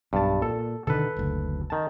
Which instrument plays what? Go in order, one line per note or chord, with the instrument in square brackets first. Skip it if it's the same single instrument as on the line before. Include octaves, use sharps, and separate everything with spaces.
[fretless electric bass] B1 [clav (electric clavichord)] G2 A5
[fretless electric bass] A#2 [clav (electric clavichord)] A4
[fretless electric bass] B2 D3 D#3 [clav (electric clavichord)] A4 B4
[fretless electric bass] F#1 D2
[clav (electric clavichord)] D#3 A5